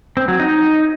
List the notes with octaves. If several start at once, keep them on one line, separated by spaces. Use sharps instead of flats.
C4
F#3
D#4